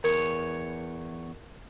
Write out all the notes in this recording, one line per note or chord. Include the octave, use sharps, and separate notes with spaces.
E2 A#4 C#5